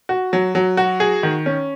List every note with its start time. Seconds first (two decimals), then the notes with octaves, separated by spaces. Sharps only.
0.09 F#4
0.33 F#3
0.55 F#3
0.77 F#4
1.00 G#4
1.23 D#3
1.46 C#4